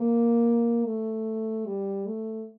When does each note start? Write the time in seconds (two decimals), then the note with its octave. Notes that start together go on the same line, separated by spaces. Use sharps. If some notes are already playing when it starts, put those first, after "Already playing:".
Already playing: A#3
0.85 A3
1.66 G3
2.06 A3